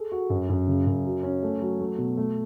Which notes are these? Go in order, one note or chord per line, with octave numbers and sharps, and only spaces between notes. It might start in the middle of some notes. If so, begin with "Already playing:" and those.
Already playing: G#4 A4
F#4
F#2
F#2
C#3
F#2
F#3
C#4
A3
F#3
A3
B2
A3